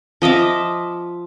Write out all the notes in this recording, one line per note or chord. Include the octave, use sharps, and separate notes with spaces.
F3 D#5 E5 D6